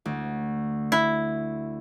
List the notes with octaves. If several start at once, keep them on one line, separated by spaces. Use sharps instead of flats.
D2
E4